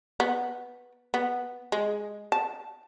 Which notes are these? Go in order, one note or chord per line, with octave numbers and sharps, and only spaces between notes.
B3
B3
G#3
A5